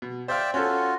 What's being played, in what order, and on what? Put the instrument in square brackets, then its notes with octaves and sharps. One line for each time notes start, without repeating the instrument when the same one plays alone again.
[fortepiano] B2
[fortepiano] C5 F5 [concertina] D5 E5 G5
[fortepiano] C#4 A4 [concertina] F4 F#4